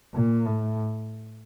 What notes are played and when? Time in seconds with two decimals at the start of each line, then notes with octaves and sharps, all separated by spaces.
0.14 A#2
0.46 A2